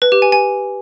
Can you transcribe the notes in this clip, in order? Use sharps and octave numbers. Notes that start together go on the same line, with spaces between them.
B4
G4
G#5
G#5